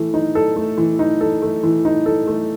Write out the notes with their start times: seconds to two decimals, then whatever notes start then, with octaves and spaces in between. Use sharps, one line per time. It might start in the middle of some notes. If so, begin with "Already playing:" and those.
Already playing: E3 A3
0.14 D#4
0.35 A4
0.56 A3
0.78 E3
0.99 D#4
1.21 A4
1.42 A3
1.63 E3
1.85 D#4
2.06 A4
2.27 A3